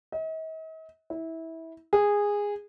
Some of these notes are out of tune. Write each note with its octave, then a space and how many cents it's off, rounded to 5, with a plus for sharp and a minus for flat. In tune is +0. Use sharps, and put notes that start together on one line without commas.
D#5 +45
E4 -20
G#4 -15